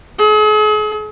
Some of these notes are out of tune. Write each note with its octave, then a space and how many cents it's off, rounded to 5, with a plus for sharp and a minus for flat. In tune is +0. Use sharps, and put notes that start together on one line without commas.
G#4 +40